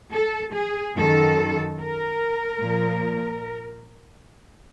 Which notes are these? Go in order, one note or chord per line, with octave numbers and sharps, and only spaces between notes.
A4
G#4
F#2 D#3 F#3 A4
A#4
A#2 F3